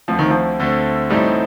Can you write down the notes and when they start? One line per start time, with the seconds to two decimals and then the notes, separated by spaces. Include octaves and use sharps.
0.08 D2 D3 F3 A3 C4
0.19 D#3
0.30 F3
0.60 D2 D3 A3 C4
1.10 A1 A2 G3 A3 C4 D#4